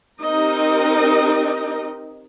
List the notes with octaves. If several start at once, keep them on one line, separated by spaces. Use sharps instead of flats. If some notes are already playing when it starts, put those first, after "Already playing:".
C4 D#4 G4 A#4 D#5